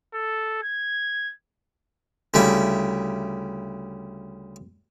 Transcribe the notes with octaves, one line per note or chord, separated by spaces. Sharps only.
A4
G#6
D2 C#3 G3 E4